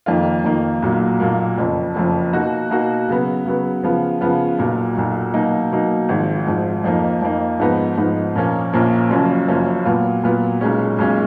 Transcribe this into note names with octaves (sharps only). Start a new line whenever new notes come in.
F2 D#3 A#3 F4
F2 D#3 A#3 F4
B1 A#2 F#3 A#3
B1 A#2 F#3 A#3
F#1 F2 F3
F#1 F2 F3
B2 A#3 D#4 F#4
B2 A#3 D#4 F#4
C#3 F#3 B3
C#3 F#3 B3
C#3 F3 B3 F4
C#3 F3 B3 F4
B1 A#2 F#3
B1 A#2 F#3
B2 F#3 A#3 D#4
B2 F#3 A#3 D#4
G#1 G#2 F3
G#1 G#2 F3
F2 F3 A#3 D#4
F2 F3 A#3 D#4
G#2 F3 B3 D#4
G#2 F3 B3 D#4
A#1 A#2 F3 A#3 C#4
A#1 A#2 F3 A#3 C#4
F#1 F#2 F3 A#3 C#4
F#1 F#2 F3 A#3 C#4
A#2 F#3 B3 F4
A#2 F#3 B3 F4
B1 A#2 G#3 C#4
B1 A#2 G#3 C#4